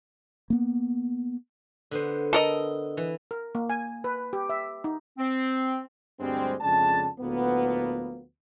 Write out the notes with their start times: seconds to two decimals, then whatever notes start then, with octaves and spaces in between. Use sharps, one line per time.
0.50 A#3 B3
1.91 D3 B3 C5
2.33 A4 A#4 D#5
2.97 E3
3.31 A#4
3.55 A#3
3.70 G#5
4.04 B4
4.33 G4
4.49 E5
4.84 D#4
5.17 C4
6.20 D2 G2 G3 G#3 C4
6.61 F2 C#3 G#3 D4 A5
7.20 D2 A2 F3 A#3 B3